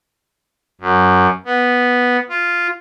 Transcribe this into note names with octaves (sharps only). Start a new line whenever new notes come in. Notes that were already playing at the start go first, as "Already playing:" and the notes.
F#2
B3
F4